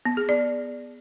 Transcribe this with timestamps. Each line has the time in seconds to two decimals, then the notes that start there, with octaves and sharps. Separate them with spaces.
0.05 B3
0.17 G#4
0.29 D5